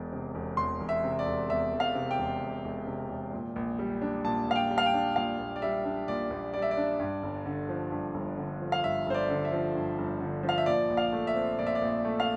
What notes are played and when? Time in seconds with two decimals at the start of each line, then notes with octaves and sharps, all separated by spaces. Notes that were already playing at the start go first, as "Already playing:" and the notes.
Already playing: E1 E2
0.12 C3
0.35 E1
0.57 E2 C6
0.81 E1
0.89 E5
1.04 C3
1.19 D5
1.26 E1
1.50 E2 E5
1.73 E1
1.80 F5
1.95 C3
2.11 G5
2.18 E1
2.41 E2
2.64 E1
2.87 C3
3.09 E1
3.33 A#2
3.56 A#1
3.79 G3
4.02 D4
4.25 A#2 A5
4.48 A#1 F5
4.56 G5
4.71 G3
4.78 F5
4.86 G5
4.94 D4
5.16 A#2 F5
5.39 A#1
5.56 D5
5.62 G3 E5
5.85 D4
6.08 A#2 D5
6.30 A#1
6.54 G3 D5
6.62 E5
6.71 D5
6.77 D4
7.00 G2
7.23 G1
7.46 D3
7.69 F3
7.92 G2
8.14 G1
8.38 D3
8.60 F3
8.72 F5
8.83 G2 E5
9.06 G1 C5
9.14 D5
9.29 D3
9.45 E5
9.52 F3
9.75 G2
9.98 G1
10.20 D3
10.43 F3
10.49 F5
10.58 E5
10.66 A#2 D5
10.90 A#1
10.97 F5
11.12 A3
11.27 E5
11.35 C4
11.59 A#2 D5
11.67 E5
11.75 D5
11.82 A#1
12.05 A3
12.20 F5